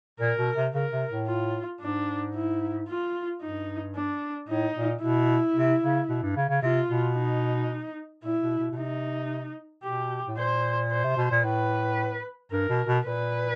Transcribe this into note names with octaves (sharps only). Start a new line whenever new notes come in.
A#2 A#4
B2
C3
C#3 A#4
C3
A2
F4
G#2 D4
E4
F4
G2 D#4
D4
A2 D#4
A#2
B2 E4
C3
C#3
B2
G2
C#3
C#3
C3 F4
B2
D#4
A#2 E4
B2
B2
B2
C3 D#4
B2 G4
A2
A#2 C5
C5
C3
B2
A#2
A2 B4
G2 A#4
B2
B2
A#2 B4